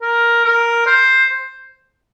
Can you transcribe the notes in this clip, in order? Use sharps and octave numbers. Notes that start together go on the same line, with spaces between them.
A#4
A#4
C5